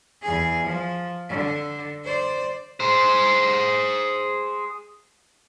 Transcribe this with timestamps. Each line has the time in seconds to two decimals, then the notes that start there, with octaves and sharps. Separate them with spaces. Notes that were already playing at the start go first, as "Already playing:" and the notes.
0.22 E2 G#4
0.63 F3
1.28 D3
2.04 C5 D5
2.80 G#4 C5